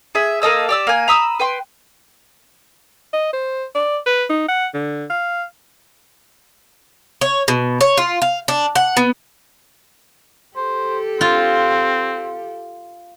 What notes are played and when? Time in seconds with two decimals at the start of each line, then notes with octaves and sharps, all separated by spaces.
0.15 G#4 E5
0.42 A#3 A4 D#5 E6
0.69 G4 D5 E6
0.87 A#3 G#5
1.08 A#5 B5 D#6 E6
1.40 B4 G5 C6
3.13 D#5
3.33 C5
3.75 D5
4.06 B4
4.30 D#4
4.48 F#5
4.74 D3
5.10 F5
7.21 C#5
7.48 B2
7.81 C#5
7.97 F4
8.22 F5
8.48 D4
8.76 F#5
8.97 B3
10.56 G4 A4 C5
11.21 C4 F4